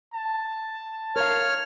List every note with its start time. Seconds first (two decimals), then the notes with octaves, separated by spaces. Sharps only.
0.13 A5
1.16 A#4 C#5 F5 F6